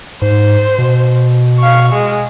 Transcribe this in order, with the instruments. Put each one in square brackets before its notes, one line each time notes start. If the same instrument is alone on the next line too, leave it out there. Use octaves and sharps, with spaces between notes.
[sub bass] G#2 [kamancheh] C5
[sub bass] B2
[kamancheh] F5 C#6
G#3